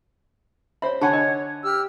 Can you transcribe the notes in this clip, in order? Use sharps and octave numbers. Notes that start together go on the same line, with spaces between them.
C5 C#5 E5 B5
D3 C#5 F#5 G#5 A5 B5 C#6
D#4 A#4 D#5
G4 E6 F6